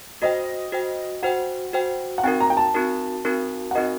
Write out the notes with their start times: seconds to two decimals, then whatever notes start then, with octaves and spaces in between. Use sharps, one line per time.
0.22 F#4 C5 D#5 G5
0.72 F#4 C5 G5
1.23 F#4 C5 F#5 G5
1.73 F#4 C5 G5
2.18 F#5
2.24 C4 D#4 F#4 A#4 G5
2.40 A#5
2.50 G5
2.57 A5
2.74 C4 D#4 F#4 A#4
3.25 C4 D#4 F#4 A#4
3.71 F#5
3.75 C4 D#4 F#4 A#4 D#5